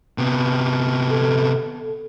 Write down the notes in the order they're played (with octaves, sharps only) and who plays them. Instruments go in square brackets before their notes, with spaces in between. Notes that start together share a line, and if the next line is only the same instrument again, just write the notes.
[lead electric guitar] C3 B3
[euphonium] A4